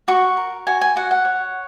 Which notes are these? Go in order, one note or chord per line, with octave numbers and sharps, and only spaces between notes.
F#4 C#6
A#4
F#4 G#5
G#5
F#4 F#5
F#5
C#5